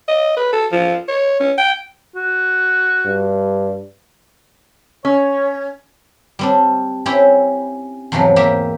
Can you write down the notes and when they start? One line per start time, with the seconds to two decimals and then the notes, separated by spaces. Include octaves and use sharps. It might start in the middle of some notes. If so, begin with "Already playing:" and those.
0.08 D#5
0.37 B4
0.53 A4
0.72 F3
1.08 C#5
1.40 C#4
1.58 G5
2.16 F#4
3.06 G2
5.05 C#4 C#5
6.39 G3 C4 D4
7.06 C4 C#4 E4 G4
8.12 E2 G#2 C3 F3 F#3
8.36 G#2 A#3 G4 E5